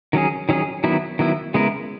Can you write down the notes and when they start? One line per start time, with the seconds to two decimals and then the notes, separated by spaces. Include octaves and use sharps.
0.13 D#3 F#3 C#4 G#4
0.49 D#3 F#3 C#4 G#4
0.84 D#3 F#3 B3 E4
1.19 D#3 F#3 B3 E4
1.54 C#3 G#3 B3 E4 A#4